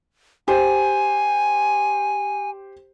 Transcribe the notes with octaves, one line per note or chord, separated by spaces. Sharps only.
G4 C5 G#5